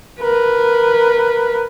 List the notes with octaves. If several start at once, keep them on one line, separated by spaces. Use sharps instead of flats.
A#4 B4